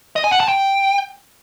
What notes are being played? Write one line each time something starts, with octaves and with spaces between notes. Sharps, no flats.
D#5
G#5
F#5
A5
G5